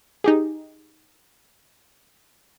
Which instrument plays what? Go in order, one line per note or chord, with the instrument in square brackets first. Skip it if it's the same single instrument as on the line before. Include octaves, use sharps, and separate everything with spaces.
[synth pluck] D#4 G4 G#4